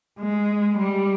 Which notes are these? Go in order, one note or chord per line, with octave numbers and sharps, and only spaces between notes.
G#3
G3